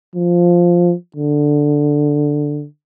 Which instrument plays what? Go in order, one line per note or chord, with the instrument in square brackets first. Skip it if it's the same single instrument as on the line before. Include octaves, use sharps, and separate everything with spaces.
[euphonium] F3
D3